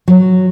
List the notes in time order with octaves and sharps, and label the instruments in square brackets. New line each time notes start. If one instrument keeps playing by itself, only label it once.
[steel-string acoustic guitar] F#3